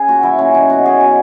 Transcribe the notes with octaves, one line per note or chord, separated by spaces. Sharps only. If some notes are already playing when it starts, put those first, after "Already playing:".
Already playing: C#3 G#4
A#2 F#4
F#3 E4
A#2 C#4
F#3 D#4
B2 F#4
F#3 G#4
B2 F#4